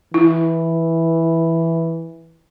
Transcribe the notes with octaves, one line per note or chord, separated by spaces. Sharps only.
E3 E4